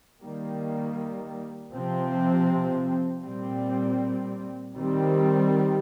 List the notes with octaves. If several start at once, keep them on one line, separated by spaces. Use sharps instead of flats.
D#3 G3 A#3
C3 F3 C4
A#2 G3 C4
D#3 G3 C4